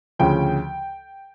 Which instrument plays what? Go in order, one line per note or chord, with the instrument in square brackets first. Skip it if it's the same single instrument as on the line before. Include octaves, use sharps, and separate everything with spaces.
[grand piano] D2 C#3 F3 G5